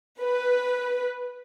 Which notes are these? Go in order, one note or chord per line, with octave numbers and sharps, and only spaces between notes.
B4